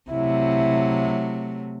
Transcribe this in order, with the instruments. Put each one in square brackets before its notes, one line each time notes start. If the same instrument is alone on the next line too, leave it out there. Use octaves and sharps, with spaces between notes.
[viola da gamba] C3 F#3 A3 [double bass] E4